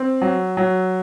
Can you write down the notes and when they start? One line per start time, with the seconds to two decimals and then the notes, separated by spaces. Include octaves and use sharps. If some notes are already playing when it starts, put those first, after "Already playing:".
Already playing: C4
0.22 F#3
0.57 F#3